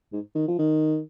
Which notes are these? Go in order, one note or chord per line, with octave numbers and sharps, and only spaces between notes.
G#2
D#3
F3
D#3